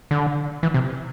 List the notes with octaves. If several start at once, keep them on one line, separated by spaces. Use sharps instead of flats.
D3
E3
C3